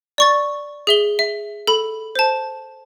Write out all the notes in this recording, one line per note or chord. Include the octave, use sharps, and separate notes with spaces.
D5 C#6 A6
G#4 E5 G7
E5
A4 B5
C5 A5